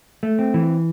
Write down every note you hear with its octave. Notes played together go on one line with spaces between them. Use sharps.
A3
C4
E3